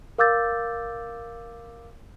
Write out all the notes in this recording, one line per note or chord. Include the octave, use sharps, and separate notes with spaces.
A#4 F5 D6 E6 G6 A6